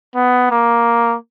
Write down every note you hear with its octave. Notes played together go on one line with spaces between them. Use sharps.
B3
A#3